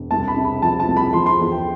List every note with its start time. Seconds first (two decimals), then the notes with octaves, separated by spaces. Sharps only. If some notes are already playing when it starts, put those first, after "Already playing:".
Already playing: E1
0.11 C2 A5
0.28 B5
0.37 C3
0.45 B5
0.62 F3 A5
0.80 A5
0.88 C2
0.97 B5
1.13 F3 C6
1.26 C6
1.40 E2
1.52 G5